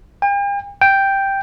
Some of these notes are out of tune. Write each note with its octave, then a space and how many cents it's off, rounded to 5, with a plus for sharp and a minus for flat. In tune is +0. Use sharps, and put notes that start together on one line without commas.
G5 +45
G5 +0